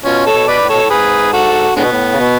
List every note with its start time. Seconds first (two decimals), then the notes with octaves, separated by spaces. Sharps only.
0.05 B2 C#4 F4
0.26 A4 C#5
0.33 B2
0.47 B4 D5
0.61 A2
0.69 B2 A4 C#5
0.81 A2
0.90 G#2 G#4 B4
1.33 F#4 A4
1.76 A2 D3 G#3 B3
1.83 B2
1.90 A2
2.13 C#3
2.19 B2